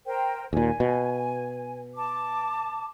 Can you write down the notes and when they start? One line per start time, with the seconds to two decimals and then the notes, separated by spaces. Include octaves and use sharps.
0.05 A#4 C5 G5
0.53 D#2 A#2 G#5
0.80 B2
1.96 A5 D6